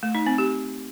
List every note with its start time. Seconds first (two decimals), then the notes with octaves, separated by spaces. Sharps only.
0.03 A3
0.15 D#4
0.26 C4
0.38 G4